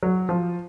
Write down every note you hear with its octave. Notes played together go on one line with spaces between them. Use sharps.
F#3
F3